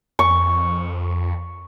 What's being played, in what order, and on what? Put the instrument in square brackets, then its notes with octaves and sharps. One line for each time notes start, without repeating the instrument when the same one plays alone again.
[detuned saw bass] F2 [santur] C#6